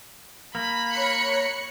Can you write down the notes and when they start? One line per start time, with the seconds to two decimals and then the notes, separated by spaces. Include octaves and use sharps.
0.55 A#3 B5
0.94 C#5 F#6 C#7